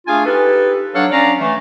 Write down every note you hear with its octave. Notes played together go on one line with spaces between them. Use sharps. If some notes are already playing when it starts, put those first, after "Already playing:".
A3 D4 F4 G#4 F5 G#5
D#4 G4 A4 B4
F#3 D4 A4 C#5 F5 F#5
C#4 D4 D5 F5 A#5
E3 A3